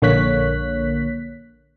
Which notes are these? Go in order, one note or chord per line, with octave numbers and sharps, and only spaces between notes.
A#1 D3 A#3 C#5 F#6 B6